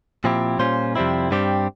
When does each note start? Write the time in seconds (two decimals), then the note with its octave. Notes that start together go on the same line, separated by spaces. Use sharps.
0.24 A#2 F3 C4 E4 G4
0.59 A#2 G3 C#4 F4 C5
0.95 F2 C3 G3 C4 E4
1.31 G2 G3 C4 G4